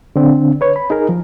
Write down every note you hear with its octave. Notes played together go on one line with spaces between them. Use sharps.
D3 C4 D4
B4 C#5
B5
D#4 G#4 A#4
F3